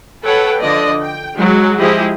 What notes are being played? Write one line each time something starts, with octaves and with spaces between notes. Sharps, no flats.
A4 B4 C#5 F#5 G5
D3 F3 D5 D#5
G5
F#3 G#3
F3 G#3 E4 G4 G#4 D#5